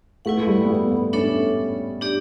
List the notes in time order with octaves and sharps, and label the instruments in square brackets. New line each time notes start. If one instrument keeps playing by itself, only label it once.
[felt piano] A3 [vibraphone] E4 B4 F#5
[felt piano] G3
B3
A3
B3
[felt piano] C#4 [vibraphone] D4 A4 C#5 E5
[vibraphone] D4 G4 D5